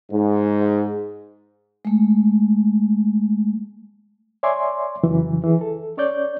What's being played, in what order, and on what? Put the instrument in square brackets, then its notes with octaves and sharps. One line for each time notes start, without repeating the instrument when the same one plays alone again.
[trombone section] G#2
[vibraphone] G#3 A3
[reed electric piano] C#5 D5 E5 G#5 C6 D6
F2 C#3 E3 F#3
E3 G#4
A4
C#4 C#5 D5 G6